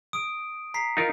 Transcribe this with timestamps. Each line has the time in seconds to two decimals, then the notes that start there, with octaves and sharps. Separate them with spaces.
0.13 D#6 D7
0.74 A#5 B6 C7
0.97 D#4 F4 A#4